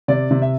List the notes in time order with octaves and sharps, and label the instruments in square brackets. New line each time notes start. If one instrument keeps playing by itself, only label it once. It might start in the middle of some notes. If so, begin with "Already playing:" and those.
[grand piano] C3 D5
C3
E5